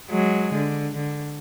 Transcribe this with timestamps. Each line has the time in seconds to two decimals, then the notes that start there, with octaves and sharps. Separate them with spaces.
0.10 F#3 G#3
0.54 D3
0.96 D3